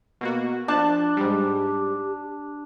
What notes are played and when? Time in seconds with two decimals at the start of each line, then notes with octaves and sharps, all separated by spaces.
0.21 B2 A#3 F#4
0.68 F3 D4 A5 F#6
1.17 G#2 G3 G4